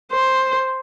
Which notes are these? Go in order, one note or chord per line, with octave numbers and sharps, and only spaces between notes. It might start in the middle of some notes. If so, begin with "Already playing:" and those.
C5